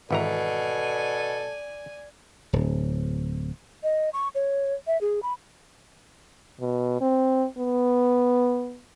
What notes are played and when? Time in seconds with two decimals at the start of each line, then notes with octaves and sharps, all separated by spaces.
0.11 G#1 B2 E3 A4 D5 G#5 A#5
2.53 D1
3.83 D#5
4.13 C#6
4.35 C#5
4.87 E5
5.01 G#4
5.23 B5
6.60 B2
7.01 C4
7.58 B3